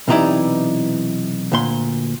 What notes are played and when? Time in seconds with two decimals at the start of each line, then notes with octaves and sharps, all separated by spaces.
0.08 B1 C3 E3 D#4 E4 D5
1.52 D2 A#2 C6